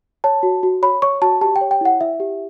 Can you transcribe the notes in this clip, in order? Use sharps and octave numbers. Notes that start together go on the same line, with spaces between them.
C#5 A5
F#4
F#4
C#5 B5
C#5 C#6
F#4 A5
G4 A5
G5
C#5
G5
E4 F#5
E4 E5
G4